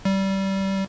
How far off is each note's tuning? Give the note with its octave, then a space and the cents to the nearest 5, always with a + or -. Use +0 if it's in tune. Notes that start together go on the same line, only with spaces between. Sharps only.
G3 -20